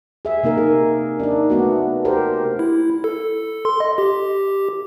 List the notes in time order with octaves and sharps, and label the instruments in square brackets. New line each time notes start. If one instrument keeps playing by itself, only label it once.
[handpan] G#4 E5
C3 A#3 D#4 A#4
G#4
D4 D#4
A3 B3 F#4
G4 A#4 C5
[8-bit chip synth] E4
A4
C6
D#5
G4